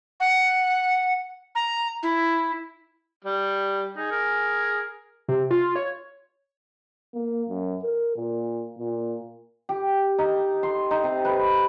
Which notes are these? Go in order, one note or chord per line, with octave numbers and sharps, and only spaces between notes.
F#5
A#5
E4
G3
D#4 G#4
A#4
C3
F4
C#5
A#3
F#2
A#4
A#2
A#2
G4
D#4
C6
D#4
C3
B4